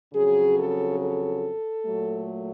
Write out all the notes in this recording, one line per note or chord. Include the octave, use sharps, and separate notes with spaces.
F2 C#3 F#3 G#4
A4
A4
A#2 F#3 A3